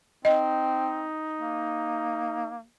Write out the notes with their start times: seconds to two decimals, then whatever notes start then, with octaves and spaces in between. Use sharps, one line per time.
0.25 C4 D#4 D#5
1.39 A#3